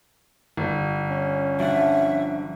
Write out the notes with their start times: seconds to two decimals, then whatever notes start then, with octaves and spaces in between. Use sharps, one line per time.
0.57 G1
1.10 C#4
1.60 F3 D4 E5 F#5